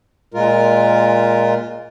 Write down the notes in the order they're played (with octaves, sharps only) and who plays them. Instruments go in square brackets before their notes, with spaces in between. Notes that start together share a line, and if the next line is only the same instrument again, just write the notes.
[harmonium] A#2 G#3 F4 A#4